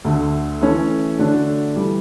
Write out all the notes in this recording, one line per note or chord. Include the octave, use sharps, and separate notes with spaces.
D2 D3 A3
E3 A3 C#4
D3 A3 D4 F#4 A4
E3 G3